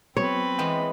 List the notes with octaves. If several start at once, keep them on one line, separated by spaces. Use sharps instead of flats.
F#3 B3 C4 B4 C#5
E3 G#3 B3 G5